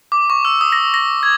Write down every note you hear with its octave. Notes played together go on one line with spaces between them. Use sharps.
D6
C#6
E6
D#6
A#6
A#6
G#6